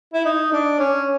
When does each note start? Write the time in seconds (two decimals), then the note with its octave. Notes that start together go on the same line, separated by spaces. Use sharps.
0.14 E4
0.25 D#4
0.53 D4
0.79 C#4